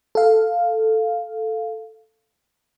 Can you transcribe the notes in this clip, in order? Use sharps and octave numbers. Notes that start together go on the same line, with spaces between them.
A4 F5